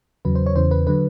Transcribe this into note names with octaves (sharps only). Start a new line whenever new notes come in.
E2 C#3 F#3 B4
C5
C#5
E2 C#3 E3 C5
B4
D3 F#3 B4